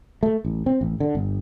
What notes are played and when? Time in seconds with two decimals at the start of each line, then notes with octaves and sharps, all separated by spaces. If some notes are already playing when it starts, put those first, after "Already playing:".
0.23 A3
0.45 A1
0.66 C4
0.81 A1
1.00 D3
1.15 G1